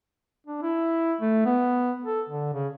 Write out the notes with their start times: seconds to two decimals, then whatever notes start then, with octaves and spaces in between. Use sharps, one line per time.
0.47 D4
0.62 E4
1.21 A3
1.46 B3
2.04 A4
2.29 D3
2.54 C#3